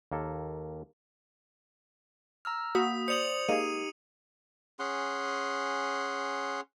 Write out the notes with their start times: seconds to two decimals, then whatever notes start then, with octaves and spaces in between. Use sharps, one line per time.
0.12 D#2 A#3 A4
2.45 A#5 E6 F6
2.75 A#3 F#4 D#6 B6
3.08 C5 D5 D#6 C#7 F7 F#7
3.49 G#3 A#3 D#4 G4 D#7
4.79 C#4 G#4 F#5 C6